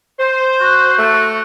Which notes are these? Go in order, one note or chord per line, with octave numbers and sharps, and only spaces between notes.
C5
F#4
A3